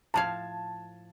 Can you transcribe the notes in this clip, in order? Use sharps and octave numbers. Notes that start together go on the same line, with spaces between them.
A2 F3 F5 A5 G#6